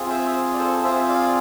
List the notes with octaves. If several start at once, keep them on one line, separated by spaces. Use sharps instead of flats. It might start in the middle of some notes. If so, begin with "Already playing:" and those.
Already playing: C4 F4 G#4
C5 E5
D5
A4 C5
C4 F4 G#4 C5 E5
D5 F5